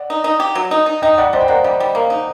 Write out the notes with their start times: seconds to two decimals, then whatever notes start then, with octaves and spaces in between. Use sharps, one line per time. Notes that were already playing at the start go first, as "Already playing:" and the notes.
Already playing: D5 F#5
0.10 D#4
0.24 D#4
0.40 G4
0.55 F#3
0.71 D#4
0.86 D#4
1.02 D#4 D#5 G5
1.18 G3 D5 F#5
1.33 G3 C5 D#5
1.41 G5
1.48 A#3 D5 F#5
1.64 G3
1.80 G3
1.95 A#3
2.10 D#4